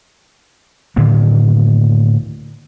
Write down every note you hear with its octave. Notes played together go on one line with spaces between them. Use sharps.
A2 D3 D#3 A#3